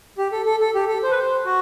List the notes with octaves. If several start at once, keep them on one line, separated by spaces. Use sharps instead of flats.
G4
A4
A4
A4
G4
A4
C5
B4
C5
F#4